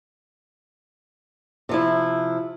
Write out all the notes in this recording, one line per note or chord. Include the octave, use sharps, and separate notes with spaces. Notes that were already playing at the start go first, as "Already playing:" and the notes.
C3 F3 E4